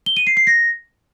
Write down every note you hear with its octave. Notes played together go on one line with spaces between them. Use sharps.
G7
D#7
C7
C7
A#6